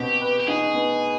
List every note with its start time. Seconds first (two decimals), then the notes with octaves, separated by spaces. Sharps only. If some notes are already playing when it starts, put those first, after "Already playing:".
Already playing: B2 C4 G4
0.21 B4
0.40 G4
0.48 D#4 G#4
0.74 B3